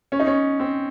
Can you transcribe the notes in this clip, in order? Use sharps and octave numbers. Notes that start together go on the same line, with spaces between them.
C#4
D#4
C#4
C4